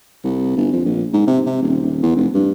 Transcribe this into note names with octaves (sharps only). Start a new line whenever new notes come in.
C2
G1
F2
A#1
G#2
C3
C3
D#1
D#1
E2
F1
G2